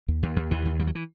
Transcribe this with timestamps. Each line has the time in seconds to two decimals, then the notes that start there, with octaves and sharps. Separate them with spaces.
0.08 D#2
0.23 D#2
0.36 D#2
0.51 D#2 E3
0.65 D#2
0.79 D#2 G3
0.87 F#3
0.95 E3